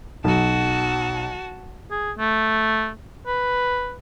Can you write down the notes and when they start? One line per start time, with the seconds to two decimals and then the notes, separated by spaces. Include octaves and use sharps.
0.24 B1 F#4 A5
1.91 G#4
2.18 A3
3.27 B4